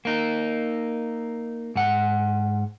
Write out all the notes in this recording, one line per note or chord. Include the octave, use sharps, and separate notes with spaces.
A#3 D#4
G#2 F#5